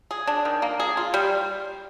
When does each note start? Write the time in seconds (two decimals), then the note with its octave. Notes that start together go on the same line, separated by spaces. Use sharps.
0.11 G#4
0.27 D4
0.45 D#3
0.62 A#3
0.80 G#4
0.97 F4
1.14 G3